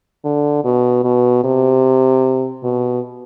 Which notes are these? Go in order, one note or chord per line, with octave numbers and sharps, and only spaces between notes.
D3
B2
B2
C3
B2